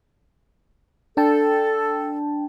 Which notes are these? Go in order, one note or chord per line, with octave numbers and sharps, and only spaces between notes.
D4 A4 G5 A5